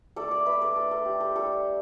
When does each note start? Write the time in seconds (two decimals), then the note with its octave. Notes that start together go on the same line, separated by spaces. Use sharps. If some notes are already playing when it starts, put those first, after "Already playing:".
0.16 A3 D4 A4 D5
0.31 A4 D5
0.46 B4 E5
0.61 A4 D5
0.76 A3 D4 A4
0.91 A4
1.06 G4
1.20 A4
1.35 G3 D4 A4